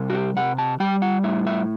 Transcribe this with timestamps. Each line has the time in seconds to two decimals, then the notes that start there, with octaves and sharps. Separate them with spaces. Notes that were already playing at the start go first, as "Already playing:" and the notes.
Already playing: C3 G3
0.10 F#4
0.14 G4
0.36 C3 F#5
0.58 A5
0.80 G3 G5
1.02 F#5
1.23 A2 E5
1.47 E5